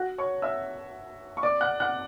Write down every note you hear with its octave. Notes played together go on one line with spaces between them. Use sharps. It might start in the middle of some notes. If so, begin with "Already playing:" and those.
Already playing: F#4 F#5
C#5 C#6
E5 E6
C#6
D5 D6
F#5 F#6
F#5 F#6